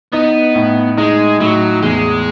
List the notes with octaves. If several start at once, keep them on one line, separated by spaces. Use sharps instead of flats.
B3 D#4
A2
G#3 D#4
A2 F#3
E2 G#3